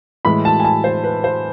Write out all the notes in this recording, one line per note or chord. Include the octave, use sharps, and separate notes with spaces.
A2 E3 G#3 B5
A5
G#5
A5
C5
B4
C5